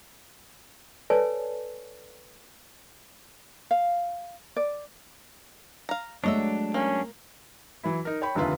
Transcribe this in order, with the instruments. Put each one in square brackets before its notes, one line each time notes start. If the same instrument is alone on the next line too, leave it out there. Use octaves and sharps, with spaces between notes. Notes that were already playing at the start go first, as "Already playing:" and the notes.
[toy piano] A4 B4 C#5 D5 G#5 A5
[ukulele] F5
D5
[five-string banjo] F5 A#5
[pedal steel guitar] F#3 D4 [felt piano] G#3 A3 [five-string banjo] C#5 D#5 E5
[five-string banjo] A#3 [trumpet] C#4
[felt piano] E3 F#3 E4
D#4 A#4
C#5 G5 B5
F1 D#2 D3 F4 B4 E5